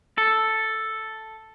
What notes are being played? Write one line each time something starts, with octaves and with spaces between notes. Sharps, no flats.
A4